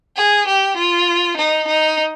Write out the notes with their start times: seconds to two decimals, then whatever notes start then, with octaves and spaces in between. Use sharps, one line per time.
0.17 G#4
0.47 G4
0.77 F4
1.38 D#4
1.68 D#4